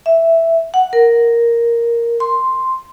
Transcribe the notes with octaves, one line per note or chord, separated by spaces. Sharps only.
E5
F#5
A#4
C6